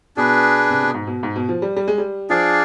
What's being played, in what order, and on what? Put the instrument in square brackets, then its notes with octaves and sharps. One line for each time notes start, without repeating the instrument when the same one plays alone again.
[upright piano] B2 [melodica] D4 G#4 B4
[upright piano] C3
B2
G#2
B2
G#2
B2
F3
G3
G3
G#3
G3
[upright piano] F3 [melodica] D4 G#4 D5 F5